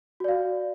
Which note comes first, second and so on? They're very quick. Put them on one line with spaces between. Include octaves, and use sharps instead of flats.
F#4 D5 F5